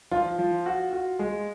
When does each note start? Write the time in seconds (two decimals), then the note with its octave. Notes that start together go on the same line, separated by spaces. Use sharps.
0.11 F3 F4
0.39 F3
0.66 F#4
0.93 F#4
1.19 G#3